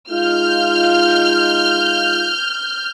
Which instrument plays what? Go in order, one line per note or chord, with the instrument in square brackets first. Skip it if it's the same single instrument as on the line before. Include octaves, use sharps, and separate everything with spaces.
[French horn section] G#3 D#4 F4 [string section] F6 G6